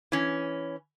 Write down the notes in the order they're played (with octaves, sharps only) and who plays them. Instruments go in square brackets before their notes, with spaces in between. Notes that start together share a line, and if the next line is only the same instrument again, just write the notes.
[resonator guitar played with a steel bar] E3 C#4